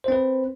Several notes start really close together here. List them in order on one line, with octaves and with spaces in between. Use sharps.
C5 C4 B4